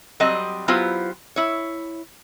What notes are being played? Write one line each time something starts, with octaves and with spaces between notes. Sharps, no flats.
F#3 G3 C4 D#5
F#3 B3 E4 F4 G4 C5
E4 C#5